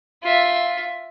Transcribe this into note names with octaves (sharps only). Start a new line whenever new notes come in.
F4 E5